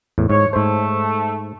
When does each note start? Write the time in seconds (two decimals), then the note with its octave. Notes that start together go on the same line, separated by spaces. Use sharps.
0.18 E2 A2
0.30 G#2 C#5
0.53 G#2 A3 C5